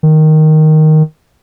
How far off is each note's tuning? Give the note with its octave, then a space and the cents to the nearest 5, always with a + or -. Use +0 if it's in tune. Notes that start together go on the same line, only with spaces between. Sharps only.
D#3 +0